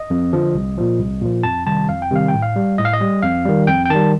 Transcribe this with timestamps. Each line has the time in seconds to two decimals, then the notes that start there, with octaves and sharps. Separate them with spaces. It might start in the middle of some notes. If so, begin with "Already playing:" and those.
Already playing: D#5
0.10 F2
0.33 D3 F3
0.55 C2
0.77 A#2 F3
0.99 C2
1.22 A#2 F3
1.43 F2 A5
1.66 C3 D#3 G3 A5
1.89 F2 F5
2.02 G5
2.11 C3 D#3 G3 F5
2.28 G5
2.33 A2
2.42 F5
2.56 G3
2.78 A2 D#5
2.85 F5
2.93 D#5
3.01 G3
3.23 F2 F5
3.45 D#3 G3
3.67 F2 G5
3.86 G5
3.90 D#3 G3 A5